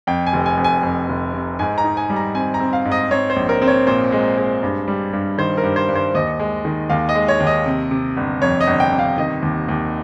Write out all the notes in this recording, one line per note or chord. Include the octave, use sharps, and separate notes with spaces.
F2 G5
G#5
F1
G#5
F2
G#5
F2
F1
C3
G#2 G#5
A#5
D#4
G#5
G3
A#5
C4 G#5
A#5
C4
F5
G#2
D#5
C4 C#5
C5
A#1
A#4
C4
C#5
A#2 C5
G#3
G#3
G2
G3
G2
D#3 C5
A#4
G2
C5
G2
C5
D#2 D#5
G#3
D#3
D#2 F5
D#5
G#3
C#5
D#2
D#5
C3
C3
G1
F2 C#5
D#5
G1
G5
C3
F5
D#3 D#5
D#2
D#2